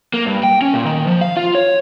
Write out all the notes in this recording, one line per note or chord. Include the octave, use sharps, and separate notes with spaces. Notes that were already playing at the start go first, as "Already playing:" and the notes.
A#3
G2
G5
C#4
A#2
D#3
F3
F5
F4
C#5